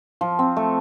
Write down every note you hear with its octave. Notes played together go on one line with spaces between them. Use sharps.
F3
C4
A3